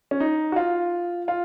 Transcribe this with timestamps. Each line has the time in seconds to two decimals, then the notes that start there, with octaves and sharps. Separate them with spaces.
0.11 C#4
0.20 D#4
0.52 F#4
0.56 F4
1.28 F4